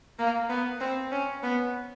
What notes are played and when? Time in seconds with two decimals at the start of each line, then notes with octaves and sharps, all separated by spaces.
0.19 A#3
0.50 B3
0.80 C4
1.12 C#4
1.43 B3